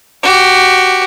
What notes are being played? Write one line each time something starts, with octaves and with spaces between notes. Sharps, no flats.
F#4 G4